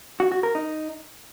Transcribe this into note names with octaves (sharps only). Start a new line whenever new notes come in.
F#4
F#4
A#4
D#4